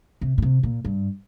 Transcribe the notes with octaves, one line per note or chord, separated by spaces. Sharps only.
C3
A#2
C3
A#2
G2